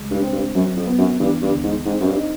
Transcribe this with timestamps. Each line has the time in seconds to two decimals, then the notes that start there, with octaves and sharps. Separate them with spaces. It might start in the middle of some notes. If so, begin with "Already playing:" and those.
Already playing: C#2 G#3
0.11 G2
0.22 C4
0.32 G2
0.55 F#2 F#3
0.76 F2
0.87 B3
0.98 F#2
1.20 G2 E3
1.42 G2
1.52 D2
1.63 G#2
1.86 G#2 C4
2.01 F#2
2.07 G2
2.17 D#4